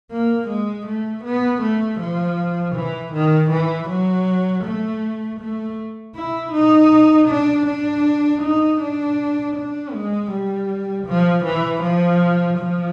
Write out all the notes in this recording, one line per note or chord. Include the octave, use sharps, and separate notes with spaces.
A#3
G#3
A3
B3
A3
F3
E3
D#3
E3
F#3
A3
A3
E4
D#4
D4
D4
D#4
D4
D4
G#3
G3
F3
E3
F3
F3